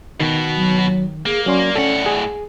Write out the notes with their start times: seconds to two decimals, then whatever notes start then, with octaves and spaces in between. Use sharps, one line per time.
0.20 B2 D#3 B3
0.56 F#3
1.26 A#3 G#4
1.46 F#3 C#4 D5 C6
1.76 A2 C#4 A4 F#5
2.06 G#4